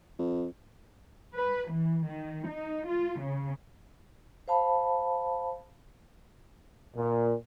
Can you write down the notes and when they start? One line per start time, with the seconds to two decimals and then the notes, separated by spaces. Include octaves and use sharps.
0.19 F2
1.34 B4
1.70 E3
2.06 D#3
2.48 D#4
2.86 F4
3.20 C#3
4.48 C5 F5 A5 B5
6.96 A#2